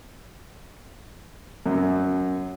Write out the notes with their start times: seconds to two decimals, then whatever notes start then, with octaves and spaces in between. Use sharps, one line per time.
1.66 F#2